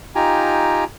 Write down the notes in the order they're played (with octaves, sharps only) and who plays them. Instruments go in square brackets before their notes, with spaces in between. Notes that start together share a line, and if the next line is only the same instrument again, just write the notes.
[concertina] D#4 F4 G4 G5 G#5 A#5